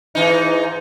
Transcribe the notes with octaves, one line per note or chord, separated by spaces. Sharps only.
G#2 E3 D#4